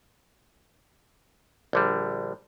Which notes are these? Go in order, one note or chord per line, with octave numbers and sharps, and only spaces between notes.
A#1 D3 G3